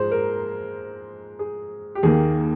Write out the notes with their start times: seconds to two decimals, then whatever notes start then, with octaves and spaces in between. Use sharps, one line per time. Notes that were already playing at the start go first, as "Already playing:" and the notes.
Already playing: G#2 F3 G#3 C5
0.12 A#4
1.39 G#4
1.95 G4
2.03 D#2 D#3 A#3 G#4